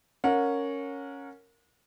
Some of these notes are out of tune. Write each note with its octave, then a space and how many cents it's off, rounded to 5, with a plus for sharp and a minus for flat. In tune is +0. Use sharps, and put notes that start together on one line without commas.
C#4 +0 A#4 -10 F#5 -35